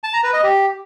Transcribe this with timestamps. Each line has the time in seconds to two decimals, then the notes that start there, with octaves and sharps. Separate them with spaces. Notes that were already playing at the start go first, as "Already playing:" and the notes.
0.04 A5
0.14 A#5
0.23 B4
0.33 D#5
0.43 G4